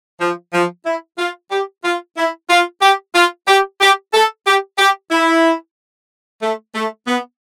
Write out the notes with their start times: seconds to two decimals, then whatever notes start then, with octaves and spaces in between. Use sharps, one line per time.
0.21 F3
0.54 F3
0.86 E4
1.19 F4
1.51 G4
1.85 F4
2.17 E4
2.50 F4
2.82 G4
3.15 F4
3.48 G4
3.81 G4
4.14 A4
4.46 G4
4.78 G4
5.11 E4
6.43 A3
6.75 A3
7.08 B3